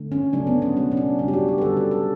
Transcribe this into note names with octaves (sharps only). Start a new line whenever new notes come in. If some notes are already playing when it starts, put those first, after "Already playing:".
Already playing: D3 A3
C#4
C#3 F#3 A3 D4
B3
C#4
B2 F#3 A3 C#4
C#4
D4
C#3 G3 D4
G4
F#4
G4
B4
D3 G3 A4
A4
A4